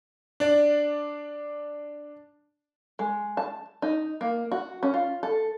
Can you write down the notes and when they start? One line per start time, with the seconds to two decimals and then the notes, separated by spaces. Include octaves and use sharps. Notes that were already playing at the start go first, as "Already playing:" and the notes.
0.40 D4 D5
2.99 G#3
3.37 A5
3.82 D#4
4.21 A#3
4.52 F#4
4.83 C#4
4.94 F4
5.23 A4